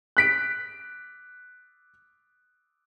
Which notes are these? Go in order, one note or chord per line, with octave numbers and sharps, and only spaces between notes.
F#6 B6 D7